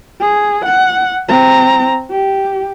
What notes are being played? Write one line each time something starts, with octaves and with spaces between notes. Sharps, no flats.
G#4
F#5
C4 A#5
G4